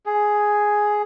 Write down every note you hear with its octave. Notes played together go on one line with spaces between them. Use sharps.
G#4